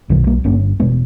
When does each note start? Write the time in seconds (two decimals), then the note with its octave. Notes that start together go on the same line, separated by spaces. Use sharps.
0.09 B1 B2 D#3 G3
0.27 G3 A#3
0.44 G1 G2 A#3 C#4
0.80 E1 B2 G#3 B3